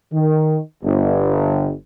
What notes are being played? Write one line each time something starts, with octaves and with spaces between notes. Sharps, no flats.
D#3
G1